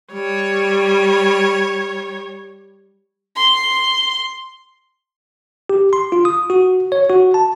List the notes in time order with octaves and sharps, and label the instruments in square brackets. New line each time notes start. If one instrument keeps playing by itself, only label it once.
[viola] G3 C#5
[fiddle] C6
[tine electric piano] G4
C6
F4
D#6
F#4
C#5
F#4
A5